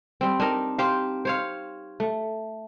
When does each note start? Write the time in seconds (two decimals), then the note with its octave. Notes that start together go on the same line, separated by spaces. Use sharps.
0.21 G3 C4
0.40 D4 D#4 A#4
0.78 G4 C5 F5
1.25 C5 C#5 F5
2.00 A3